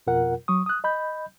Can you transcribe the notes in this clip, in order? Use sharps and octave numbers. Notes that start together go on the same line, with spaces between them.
F2 B2 F4 A#4 F#5
F#3 C#6 D#6
D#6 F#6
D#5 B5 G6